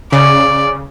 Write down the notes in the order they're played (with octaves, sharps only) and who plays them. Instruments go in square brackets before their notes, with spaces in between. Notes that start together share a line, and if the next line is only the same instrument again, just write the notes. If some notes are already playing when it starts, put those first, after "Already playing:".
[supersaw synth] C#3 [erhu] D5